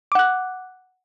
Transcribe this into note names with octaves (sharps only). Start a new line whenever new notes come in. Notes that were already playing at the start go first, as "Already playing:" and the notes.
F#5 D6 F#6